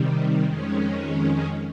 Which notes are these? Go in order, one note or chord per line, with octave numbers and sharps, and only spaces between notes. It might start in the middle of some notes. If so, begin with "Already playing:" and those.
Already playing: C3 D#3 G3
F2 D#3 G#3 C#4